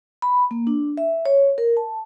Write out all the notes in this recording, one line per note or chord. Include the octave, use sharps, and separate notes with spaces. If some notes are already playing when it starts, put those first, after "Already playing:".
B5
A#3
D4
E5
C#5
A#4
A5